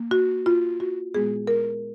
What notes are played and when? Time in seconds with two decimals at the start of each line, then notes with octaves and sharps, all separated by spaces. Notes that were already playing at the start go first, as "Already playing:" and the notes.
Already playing: A#3
0.11 F#4
0.46 F4
0.80 F#4
1.14 A#2 G#3 B3 G#4
1.47 A#4